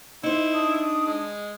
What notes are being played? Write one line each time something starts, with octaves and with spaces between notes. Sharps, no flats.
D#4 E4 C5
D4 D#6
G#3